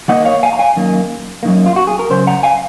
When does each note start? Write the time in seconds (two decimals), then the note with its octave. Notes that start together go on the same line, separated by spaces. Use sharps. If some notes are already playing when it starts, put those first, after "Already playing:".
0.08 D#3 A#3 D#4 D#5 F#5
0.25 C#5 F5
0.43 F5 G#5
0.53 A#5
0.59 F5 G#5
0.76 F#2 D#3 A#3
1.43 F#2 D#3 A#3
1.66 F4
1.76 F#4
1.87 G#4
1.99 A#4
2.10 F#2 C#3 C5
2.27 F#5 A#5
2.43 F5 G#5